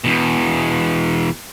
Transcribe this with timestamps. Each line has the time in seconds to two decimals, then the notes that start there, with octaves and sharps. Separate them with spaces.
0.04 E2 B2